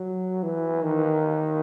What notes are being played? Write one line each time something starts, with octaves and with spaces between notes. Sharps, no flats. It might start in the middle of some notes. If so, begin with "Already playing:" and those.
Already playing: F#3
E3
D#3